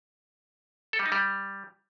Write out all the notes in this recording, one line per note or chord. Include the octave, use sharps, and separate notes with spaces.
A4
G3
D#4
G3